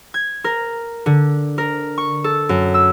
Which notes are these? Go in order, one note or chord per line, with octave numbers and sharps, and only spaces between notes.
G#6
A#4
D3
A#4
C#6
A4
F#2
E6